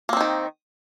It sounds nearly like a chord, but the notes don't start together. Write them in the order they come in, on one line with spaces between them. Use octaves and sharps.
A#3 C4 D#4 D#3